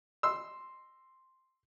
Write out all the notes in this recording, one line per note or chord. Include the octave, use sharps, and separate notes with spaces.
C6 E6